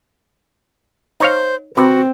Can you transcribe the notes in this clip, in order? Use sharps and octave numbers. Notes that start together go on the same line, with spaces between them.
D#4 C5 C#5 F5
C3 C4 F#4 B4